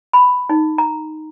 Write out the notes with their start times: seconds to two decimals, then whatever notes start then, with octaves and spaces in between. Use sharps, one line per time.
0.13 B5
0.49 D#4
0.78 A#5